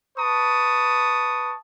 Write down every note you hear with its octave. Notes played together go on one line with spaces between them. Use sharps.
B4 A5 C#6 D#6